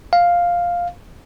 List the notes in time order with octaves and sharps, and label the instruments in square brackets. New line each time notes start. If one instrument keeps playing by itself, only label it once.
[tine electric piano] F5